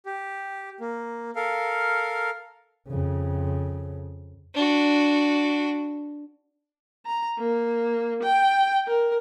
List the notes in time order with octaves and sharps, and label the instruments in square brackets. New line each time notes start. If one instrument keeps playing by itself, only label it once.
[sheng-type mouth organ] G4
A#3
A4 A#4 F5
[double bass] F2 C#3
[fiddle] D4 F#4
[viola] A#5
A#3
G5
A#4